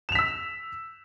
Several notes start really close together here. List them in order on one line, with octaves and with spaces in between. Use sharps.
E7 F7 B6 E6